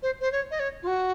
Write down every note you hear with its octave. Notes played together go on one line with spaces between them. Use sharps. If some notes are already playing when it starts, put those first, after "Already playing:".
C5
C5
C#5
D#5
C#5
F4
F#4